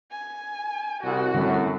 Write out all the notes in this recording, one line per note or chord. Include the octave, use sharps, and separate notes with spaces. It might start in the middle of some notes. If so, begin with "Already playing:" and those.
G#5
C2 F#4
F#2 A2 D3 G3 C4